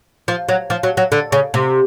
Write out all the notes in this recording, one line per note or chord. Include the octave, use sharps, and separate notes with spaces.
F3
F#3
F3
F#3
F#3
D3
C#3
C3